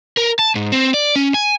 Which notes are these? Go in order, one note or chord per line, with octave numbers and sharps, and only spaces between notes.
A#4
A5
G#2
C4
D5
C#4
G#5